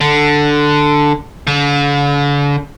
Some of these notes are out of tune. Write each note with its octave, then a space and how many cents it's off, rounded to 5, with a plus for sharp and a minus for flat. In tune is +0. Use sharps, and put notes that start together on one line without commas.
D3 +5
D3 -40